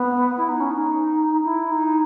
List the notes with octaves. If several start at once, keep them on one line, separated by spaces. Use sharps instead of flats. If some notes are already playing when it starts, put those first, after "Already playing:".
Already playing: B3
E4
D#4
C#4
D#4
E4
D#4